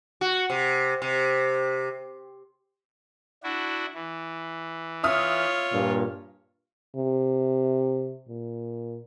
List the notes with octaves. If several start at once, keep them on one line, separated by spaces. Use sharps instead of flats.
F#4
C3
C3
D4 E4 F#4
E3
F4 C#5 E5 D#6 F6
G2 A#2
C3
A#2